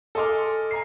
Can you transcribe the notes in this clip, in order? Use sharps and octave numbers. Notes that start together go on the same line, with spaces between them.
A4 D#5 G#5 C6 D6 F6
G#5 A#5 C7